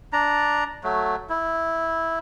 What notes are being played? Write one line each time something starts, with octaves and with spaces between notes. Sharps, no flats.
D4 A#5
F#3 A3
E4